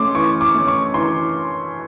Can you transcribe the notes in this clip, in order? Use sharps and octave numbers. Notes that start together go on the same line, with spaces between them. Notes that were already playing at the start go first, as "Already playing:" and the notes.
Already playing: A3 C#4 C6 D6
E3 C#6
D6
A3 C#4
C#6
E3 C6